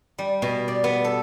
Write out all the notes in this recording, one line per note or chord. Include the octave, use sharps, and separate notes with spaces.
G3
B2
D5
B3
A4